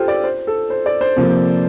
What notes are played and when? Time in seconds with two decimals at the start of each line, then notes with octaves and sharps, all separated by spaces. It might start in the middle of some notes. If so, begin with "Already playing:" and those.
Already playing: F4 G4 A4 C5
0.08 D5
0.24 C5
0.47 A4
0.70 C5
0.86 D5
1.01 C5
1.17 C3 F3 A#3